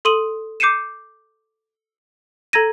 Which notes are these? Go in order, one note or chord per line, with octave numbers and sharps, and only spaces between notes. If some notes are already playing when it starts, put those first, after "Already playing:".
A4 C6 D#6 D#7 F#7
D6 G6 C7 C#7 D#7 E7
A4 A#5 G#6 A#6 D#7